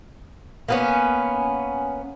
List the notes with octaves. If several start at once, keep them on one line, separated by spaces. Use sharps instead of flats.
A#3 B3 C#4